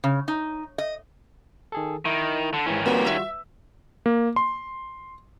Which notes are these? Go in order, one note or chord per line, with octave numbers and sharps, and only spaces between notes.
C#3
D#4
D#5
D#3 G#4 A4
D#3 E4
D3 A5
G#2 D#3 E3 C#4
G3 A3 F4 F#4
E5
A#3
C6